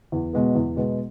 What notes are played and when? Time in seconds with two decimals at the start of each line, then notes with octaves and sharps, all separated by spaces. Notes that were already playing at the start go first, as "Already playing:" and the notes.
0.12 E2
0.33 B2 G#3 B3
0.55 E2
0.76 B2 G#3 B3